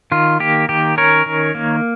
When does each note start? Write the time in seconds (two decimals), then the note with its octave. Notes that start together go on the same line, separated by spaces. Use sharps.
0.12 D#3 F4
0.40 A#3 G4
0.69 D#3 G4
0.97 C#4 A#4 C#5
1.26 D#3
1.55 A#3